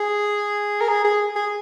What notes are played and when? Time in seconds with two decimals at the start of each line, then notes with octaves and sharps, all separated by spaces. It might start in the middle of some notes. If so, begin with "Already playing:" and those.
Already playing: G#4
0.81 A#4
0.89 G#4
1.04 G#4
1.35 G#4